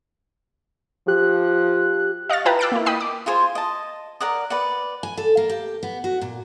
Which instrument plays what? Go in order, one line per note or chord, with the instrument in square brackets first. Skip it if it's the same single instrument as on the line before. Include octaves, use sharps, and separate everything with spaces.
[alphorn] F3 [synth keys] G4 F#6
[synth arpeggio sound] D#5 F5 C#6 F6 A6
E4 F4 B4 G5 A5 A#5
D6 E6 F#6 A6 C7 D7
A#3 E4
D#5 G5 B5 D#6
D6
[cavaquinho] F4 G#4 C5 G#5
D#5 A5
A#4 D5 F#5 D#6
B4 D5 F#5
[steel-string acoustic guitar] G#5
A4
A#3
G4
B3
F#4
A#2